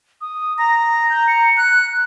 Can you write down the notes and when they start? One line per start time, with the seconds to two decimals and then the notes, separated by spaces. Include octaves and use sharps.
0.21 D#6
0.58 A#5 A#6
1.10 G6
1.28 C#7
1.57 F#6